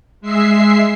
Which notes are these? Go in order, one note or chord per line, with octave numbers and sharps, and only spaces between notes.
G#3 E5 C7